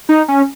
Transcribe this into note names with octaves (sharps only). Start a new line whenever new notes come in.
D#4
C#4